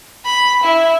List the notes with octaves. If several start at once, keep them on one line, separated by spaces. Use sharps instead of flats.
B5
E4